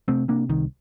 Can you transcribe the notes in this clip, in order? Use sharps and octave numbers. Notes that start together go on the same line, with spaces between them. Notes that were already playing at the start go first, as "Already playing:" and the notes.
C3 A3 C4
C3 A#3 D4
C2 D#3